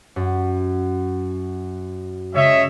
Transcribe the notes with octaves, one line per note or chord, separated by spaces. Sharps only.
F#2
C#3 G#3 C#5 D#5 E5